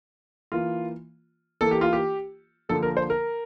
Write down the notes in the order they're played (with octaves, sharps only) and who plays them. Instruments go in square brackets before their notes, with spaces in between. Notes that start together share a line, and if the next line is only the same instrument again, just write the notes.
[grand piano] E3 A#3 F4
E3 A#3 A4
G4
F4
G4
D3 F3 A#3 A4
A#4
C5
A#4